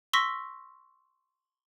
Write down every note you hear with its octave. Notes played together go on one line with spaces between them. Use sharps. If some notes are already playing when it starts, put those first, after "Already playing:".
C6 C#6 E6 A#6 B6